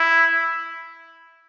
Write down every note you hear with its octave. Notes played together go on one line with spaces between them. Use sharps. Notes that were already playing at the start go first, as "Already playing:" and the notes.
Already playing: E4